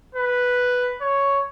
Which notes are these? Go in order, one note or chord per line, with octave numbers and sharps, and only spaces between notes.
B4
C#5